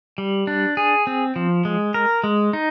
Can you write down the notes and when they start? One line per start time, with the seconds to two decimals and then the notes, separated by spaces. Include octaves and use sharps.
0.18 G3
0.47 D4
0.77 G#4
1.07 C4
1.36 F3
1.65 G#3
1.94 A#4
2.24 G#3
2.53 D#4